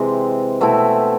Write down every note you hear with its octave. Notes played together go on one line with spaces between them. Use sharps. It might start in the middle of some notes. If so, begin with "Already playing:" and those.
Already playing: C3 E3 G#3 C4
B2 A3 C4 E4